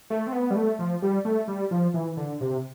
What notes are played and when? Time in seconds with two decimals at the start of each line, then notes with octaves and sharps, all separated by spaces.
0.10 A3
0.27 C4
0.33 B3
0.51 G3
0.56 A3
0.79 F3
1.02 G3
1.25 A3
1.48 G3
1.71 F3
1.94 E3
2.17 D3
2.41 C3